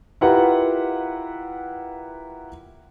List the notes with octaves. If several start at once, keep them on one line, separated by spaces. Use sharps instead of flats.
E4 F4 G4 A#4 B4 F#5